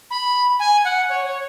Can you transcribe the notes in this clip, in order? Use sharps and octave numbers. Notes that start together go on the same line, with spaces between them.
B5
G#5
F#5
C#5
C#5